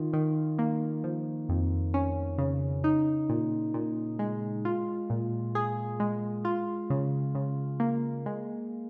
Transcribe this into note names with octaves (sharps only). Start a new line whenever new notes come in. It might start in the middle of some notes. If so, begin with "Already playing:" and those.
Already playing: D#3 F4
D#3
A#3
F3
F2
C#4
C#3
D#4
A#2
A#2
G#3
F4
A#2
G#4
G#3
F4
C#3
C#3
A#3
G#3